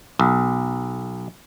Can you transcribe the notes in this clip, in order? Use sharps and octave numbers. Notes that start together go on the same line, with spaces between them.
B1